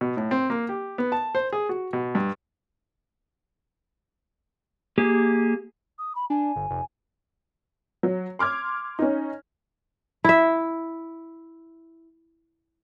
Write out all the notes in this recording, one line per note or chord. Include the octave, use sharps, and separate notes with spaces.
B2
A2
C4
A#3
G4
B3
A5
C5
G#4
F#4
B2
G2
A#3 G4 G#4
D#6
B5
D4 G#5
G1
F1
F#3
C6 D6 F6 G#6
C#4 D#4
E4 E5